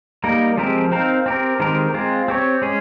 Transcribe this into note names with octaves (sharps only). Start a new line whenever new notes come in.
G3 A#3 D#4 A#4
F3 G#3 C4 G4 A#4
C4 D#4 A#4 F5
C4 G4 A#4
D#3 G#3 C4 G4 A#4
G#3 C4 F4
C4 G4 C#5
G#3 C#4 G#4